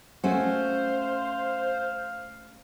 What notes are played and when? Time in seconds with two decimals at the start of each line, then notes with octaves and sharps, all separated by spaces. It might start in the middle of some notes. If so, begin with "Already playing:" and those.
0.24 A3 C#4 F#4 C5 F5